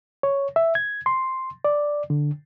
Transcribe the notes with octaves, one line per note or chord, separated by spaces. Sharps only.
C#5
E5
G#6
C6
D5
D3